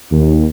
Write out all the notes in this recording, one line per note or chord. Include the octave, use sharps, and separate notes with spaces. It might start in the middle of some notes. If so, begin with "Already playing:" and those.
D#2